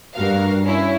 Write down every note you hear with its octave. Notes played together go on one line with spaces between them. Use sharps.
G2 F#4 A#4 F5
C#4 E4